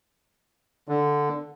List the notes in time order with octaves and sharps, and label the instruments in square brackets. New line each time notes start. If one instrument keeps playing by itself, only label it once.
[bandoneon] D3